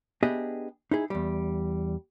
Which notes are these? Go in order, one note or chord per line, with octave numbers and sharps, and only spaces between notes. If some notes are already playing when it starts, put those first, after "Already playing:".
B3 D4 G4 G#4 D#5 E5
D#4 E4 G#4
E2 G3